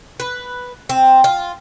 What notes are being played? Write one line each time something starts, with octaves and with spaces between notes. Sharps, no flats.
B4
C4
F4